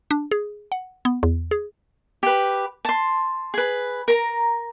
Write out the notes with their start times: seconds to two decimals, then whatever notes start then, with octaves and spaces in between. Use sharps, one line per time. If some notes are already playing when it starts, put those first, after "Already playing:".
0.11 D4
0.31 G#4
0.72 F#5
1.05 B3
1.23 E2
1.51 G#4
2.23 G4 B4
2.85 A5 C6
3.54 G#4 B4
4.08 A#4 A#5